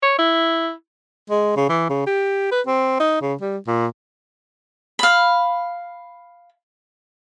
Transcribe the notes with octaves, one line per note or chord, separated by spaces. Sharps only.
C#5
E4
G#3
C#3
E3
C#3
G4
B4
C4
D#4
C#3
G3
A#2
F5 B5